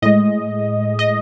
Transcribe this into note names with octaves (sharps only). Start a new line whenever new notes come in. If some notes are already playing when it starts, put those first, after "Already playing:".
A2 G#3 D#5
D#5